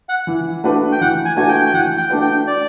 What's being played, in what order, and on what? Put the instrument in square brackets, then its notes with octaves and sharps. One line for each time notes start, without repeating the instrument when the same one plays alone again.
[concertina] F#5
[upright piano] E3
A3 D4 F#4 B4
[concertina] G5
[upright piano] E3 [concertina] F#5
[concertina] G#5
[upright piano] A3 D4 F#4 B4 [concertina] G#5
[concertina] G5
G5
[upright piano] E3 [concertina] F#5
[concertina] G5
[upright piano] A3 D4 F#4 B4
[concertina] G5
D5